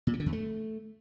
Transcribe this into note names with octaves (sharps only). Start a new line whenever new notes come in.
A#2
C3
D3
E2
A3